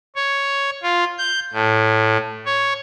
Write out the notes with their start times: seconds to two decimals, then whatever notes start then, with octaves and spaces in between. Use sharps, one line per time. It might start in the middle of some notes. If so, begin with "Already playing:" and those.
0.16 C#5
0.83 F4
1.18 G6
1.53 A2
2.46 C#5